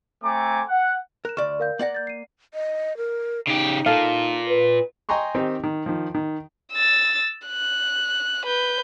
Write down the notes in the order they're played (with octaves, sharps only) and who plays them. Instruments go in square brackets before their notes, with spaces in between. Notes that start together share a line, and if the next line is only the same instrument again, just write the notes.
[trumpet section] A3 C4 G#5 A#5 D6
F#5
[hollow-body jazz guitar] A#4 [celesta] F#6 E7
[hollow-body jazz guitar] D2 D5 [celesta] C#6 F6 E7
[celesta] A#4 F5 G6
[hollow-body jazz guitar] A#3 D5 F#5 [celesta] A#6 F#7
[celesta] G6 A6
C7 D#7
[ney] D#5
A#4
[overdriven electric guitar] C#3 G4 [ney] D#4
[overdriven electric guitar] A#2 [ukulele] A4 F5
[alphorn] B4
[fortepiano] D#5 G5 G#5 A#5 C6 C#6
D#3 C4 D#4 G4
D#3
D#3 F3
D#3
[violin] E6 A6
F#6
B4 G6